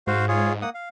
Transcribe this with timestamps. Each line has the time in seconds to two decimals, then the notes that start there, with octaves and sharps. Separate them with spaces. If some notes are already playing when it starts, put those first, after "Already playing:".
0.07 G#2 F#4 C5 F5
0.28 F4 G#4 C#5
0.62 A#3 F#5 D#6
0.75 F5